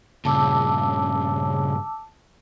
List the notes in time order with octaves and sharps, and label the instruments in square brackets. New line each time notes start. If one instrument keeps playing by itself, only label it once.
[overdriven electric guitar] G2 A#2 [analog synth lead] C#3 [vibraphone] A5 D6 E6